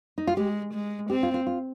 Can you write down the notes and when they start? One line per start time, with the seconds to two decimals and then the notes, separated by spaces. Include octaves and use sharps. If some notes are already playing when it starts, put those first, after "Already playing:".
0.18 D#4
0.27 F4
0.37 G#3 G4
0.74 G#3
1.10 C4 G4
1.23 F4
1.34 F4
1.47 F4